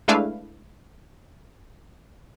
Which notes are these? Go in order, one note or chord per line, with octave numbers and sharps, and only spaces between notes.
G#3 A3 D4 E4 B4 F5